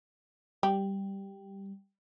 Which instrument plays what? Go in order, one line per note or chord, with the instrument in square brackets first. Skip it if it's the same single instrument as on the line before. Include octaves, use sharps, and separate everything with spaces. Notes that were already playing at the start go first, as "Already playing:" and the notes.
[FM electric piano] G3 [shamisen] G4